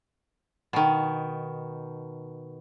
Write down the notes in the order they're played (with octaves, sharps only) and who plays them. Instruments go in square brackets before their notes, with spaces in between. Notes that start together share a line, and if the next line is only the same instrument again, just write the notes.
[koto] B2 D#3